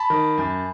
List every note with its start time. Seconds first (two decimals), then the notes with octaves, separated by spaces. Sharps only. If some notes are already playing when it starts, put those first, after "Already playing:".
Already playing: A5 B5
0.10 D#3
0.38 F#2